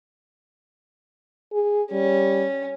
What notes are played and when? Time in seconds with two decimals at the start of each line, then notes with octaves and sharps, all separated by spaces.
1.53 G#4
1.92 G3 C#4